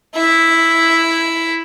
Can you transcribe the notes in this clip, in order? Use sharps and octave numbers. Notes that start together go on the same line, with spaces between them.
E4 E5